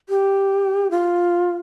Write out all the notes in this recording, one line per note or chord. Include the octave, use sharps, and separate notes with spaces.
G4
F4